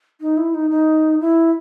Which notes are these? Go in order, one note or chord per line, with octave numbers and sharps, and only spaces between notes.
D#4
E4
D#4
D#4
E4